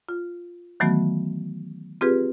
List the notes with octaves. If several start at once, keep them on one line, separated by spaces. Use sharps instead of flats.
F4
D#3 E3 F#3 A3 B3 F#4
C4 F4 G4 G#4 B4